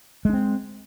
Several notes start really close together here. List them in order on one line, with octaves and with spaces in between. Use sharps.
G#3 D4 C4